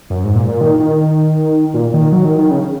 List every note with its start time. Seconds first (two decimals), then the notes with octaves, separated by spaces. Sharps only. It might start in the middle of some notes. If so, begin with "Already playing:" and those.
0.10 F#2
0.24 G#2
0.35 A#2
0.48 A#2
0.61 D#3
0.80 D#3
1.74 A#2
1.94 D#3
2.12 F#3
2.25 D#3
2.38 D#3
2.51 C#3